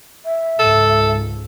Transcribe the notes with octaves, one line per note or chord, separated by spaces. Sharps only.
E5
C#2 G#2 A4